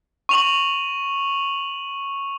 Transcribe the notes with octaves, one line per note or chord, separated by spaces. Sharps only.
C#6 F7 F#7